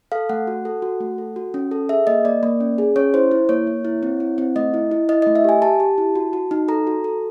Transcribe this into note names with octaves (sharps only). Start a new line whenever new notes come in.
A4 F5
A3 F#5
F#4
A4
F#4
A3
A4
F#4
C#4
A4
G#4 E5
A#3 D#5
A#3 D5
A#3
C#4
G#4
C#4 C#5
E4 C5
E4
A#3 C#5
A#3
E4
C4
E4
C4
A3 D#5
E4
E4
E4 D#5
A3 D#5
E5
G4 G#5
G4 A5
G4
E4
F#4
F#4
D#4
A4 A#5
F#4
A4